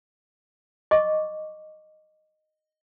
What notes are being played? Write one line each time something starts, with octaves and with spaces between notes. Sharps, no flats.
D#5 C#6 D6